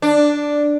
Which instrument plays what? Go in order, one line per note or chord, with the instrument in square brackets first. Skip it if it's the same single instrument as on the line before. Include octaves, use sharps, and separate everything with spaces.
[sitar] D4